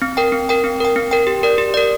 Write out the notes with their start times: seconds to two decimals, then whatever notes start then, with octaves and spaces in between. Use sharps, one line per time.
0.02 C4
0.17 A#4 G5
0.32 C4
0.49 A#4 G5
0.64 C4
0.80 A#4 G5
0.96 C4
1.11 A#4 G5
1.27 G4
1.43 A#4 D5
1.58 G4
1.74 A#4 D5